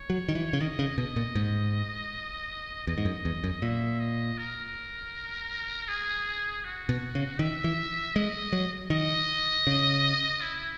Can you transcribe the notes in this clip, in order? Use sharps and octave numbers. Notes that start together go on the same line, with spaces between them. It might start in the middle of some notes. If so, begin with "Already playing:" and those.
Already playing: C#5
F#3
D#3
E3
C#3
D#3 D#5
C#3
B2 D#5
A#2
G#2
E2 D#5
G#2
F#2
E2
F#2
A#2 E5
D#5
A#4
G#4
F#4
B2
C#3
D#3 E5
E3
G#3 D#5
F#3
D#3 D#5
C#3
E4